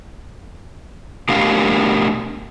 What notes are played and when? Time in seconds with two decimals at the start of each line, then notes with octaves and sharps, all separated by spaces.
1.29 B2 A3 D4 G4 A#4 F5